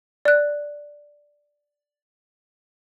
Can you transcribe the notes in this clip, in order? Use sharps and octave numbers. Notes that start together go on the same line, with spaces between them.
D5 F#6